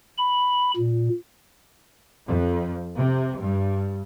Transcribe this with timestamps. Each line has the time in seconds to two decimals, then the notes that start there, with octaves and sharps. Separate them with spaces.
0.18 B5
0.76 A#2
2.26 F2
2.96 C3
3.39 G2